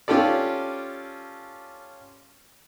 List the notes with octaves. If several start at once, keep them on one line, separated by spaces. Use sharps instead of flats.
C#4 F4 G4 A4 D5